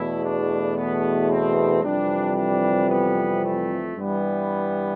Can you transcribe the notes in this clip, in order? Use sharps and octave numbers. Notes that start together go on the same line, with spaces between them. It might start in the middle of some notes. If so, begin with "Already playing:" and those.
Already playing: E2 B2 A3 E4
D4
B3
C4
F2 C3 E3 G3 D4
D4
B3
A3
G2 E3 G3 B3